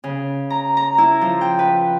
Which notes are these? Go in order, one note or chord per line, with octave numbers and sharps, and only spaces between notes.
C#3
A#5
A#5
E4
F3
G5
B4